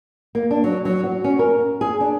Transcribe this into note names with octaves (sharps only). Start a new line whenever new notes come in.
A#3
D4
F#3
F#3
F#4
C#4
A#4
G#4
D4